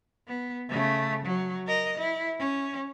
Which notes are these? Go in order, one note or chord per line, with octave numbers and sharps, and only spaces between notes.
B3
C#3 A3
F#3
A#4 D#5
E4
C#4